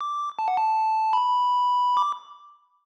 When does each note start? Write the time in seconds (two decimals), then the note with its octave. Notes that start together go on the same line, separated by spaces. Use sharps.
0.01 D6
0.39 A5
0.48 F#5
0.57 A5
1.13 B5
1.97 D6